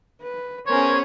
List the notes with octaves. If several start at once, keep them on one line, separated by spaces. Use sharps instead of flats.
B4
B3 C#4 G#4 A#4 C5 C#5